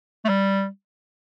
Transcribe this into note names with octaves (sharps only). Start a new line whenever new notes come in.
A3
G3